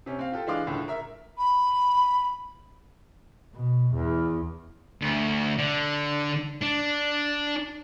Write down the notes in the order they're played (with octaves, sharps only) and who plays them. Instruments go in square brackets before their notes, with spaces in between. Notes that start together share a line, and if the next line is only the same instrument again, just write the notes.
[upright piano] C3 C#4
C4 F5
F4 G4 A4
E3 G#3 D4 F5 C6 D6
C#2 A2 D3
A#4 E5
[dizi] B5
[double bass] B2
E2
[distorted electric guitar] D2
D3
D4